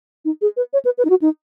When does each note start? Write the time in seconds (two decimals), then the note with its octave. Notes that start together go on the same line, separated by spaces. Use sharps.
0.25 D#4
0.42 G#4
0.57 B4
0.73 C#5
0.85 B4
0.98 B4
1.05 D#4
1.10 F#4
1.22 D#4